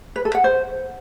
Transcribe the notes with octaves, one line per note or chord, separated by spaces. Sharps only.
B4
A4
F#5
C5